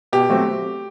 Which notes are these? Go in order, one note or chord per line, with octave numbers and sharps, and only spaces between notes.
B2 G4
F#3 A3 C4